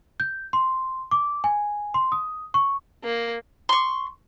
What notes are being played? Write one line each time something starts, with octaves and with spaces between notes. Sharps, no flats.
G6
C6
D6
G#5
C6
D#6
C#6
A#3
C6 C#6